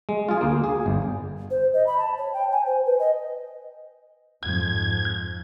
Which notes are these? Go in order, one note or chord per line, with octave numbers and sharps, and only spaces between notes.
G#3
F4 G#4
D2 A#3
G#4
G1
C5
D#5
B5
A5
C#5
G5
G#5
C5
B4
D#5
F2 G#2 G#6